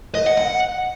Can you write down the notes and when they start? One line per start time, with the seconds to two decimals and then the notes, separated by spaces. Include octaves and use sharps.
0.15 D#5
0.26 F#5
0.38 F#5